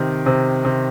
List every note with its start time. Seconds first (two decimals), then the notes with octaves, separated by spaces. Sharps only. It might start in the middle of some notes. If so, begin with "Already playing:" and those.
Already playing: C3 D#3
0.26 C3
0.65 C3